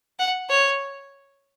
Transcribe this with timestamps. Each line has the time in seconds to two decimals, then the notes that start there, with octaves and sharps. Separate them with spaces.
0.19 F#5
0.50 C#5